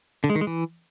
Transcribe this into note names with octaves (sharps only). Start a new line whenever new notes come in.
D3
G#3
D#3
G#3
E3